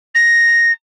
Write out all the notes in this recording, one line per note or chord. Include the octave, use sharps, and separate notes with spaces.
A#6